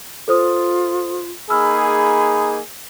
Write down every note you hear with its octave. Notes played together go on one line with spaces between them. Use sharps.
F4 A4 C5 D#6
A#3 D#4 G#4 B5 E6 F6